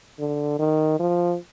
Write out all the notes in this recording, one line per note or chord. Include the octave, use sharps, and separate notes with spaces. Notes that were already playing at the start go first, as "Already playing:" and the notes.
D3
D#3
F3